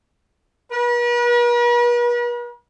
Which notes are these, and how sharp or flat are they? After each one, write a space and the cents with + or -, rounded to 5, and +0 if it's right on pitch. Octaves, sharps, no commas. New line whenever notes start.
B4 -45